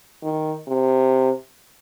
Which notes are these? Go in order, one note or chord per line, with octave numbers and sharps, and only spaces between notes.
D#3
C3